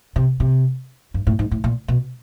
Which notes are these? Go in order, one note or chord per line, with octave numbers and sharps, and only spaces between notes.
C3
C3
G2
A2
G#2
A2
A#2
B2